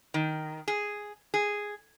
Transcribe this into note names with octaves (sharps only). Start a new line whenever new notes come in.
D#3
G#4
G#4